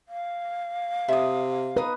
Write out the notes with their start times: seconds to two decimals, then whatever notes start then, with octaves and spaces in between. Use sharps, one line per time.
0.09 F5
1.08 C3 E5 D#6
1.77 D#4 B4 D#6